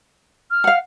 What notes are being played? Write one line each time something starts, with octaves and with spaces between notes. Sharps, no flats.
F6
F5 F#5